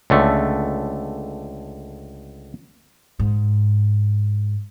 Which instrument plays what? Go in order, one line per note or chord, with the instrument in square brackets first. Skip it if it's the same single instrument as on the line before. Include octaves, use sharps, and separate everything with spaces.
[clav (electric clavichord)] C#2 D3 A3
[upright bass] G#2